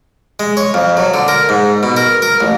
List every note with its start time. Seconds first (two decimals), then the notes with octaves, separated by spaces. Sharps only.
0.40 G#3
0.57 C#5
0.74 F2
0.97 F#3
1.14 D3
1.28 A#4
1.49 G#2
1.83 B2
1.97 A#4
2.22 A#4
2.40 A1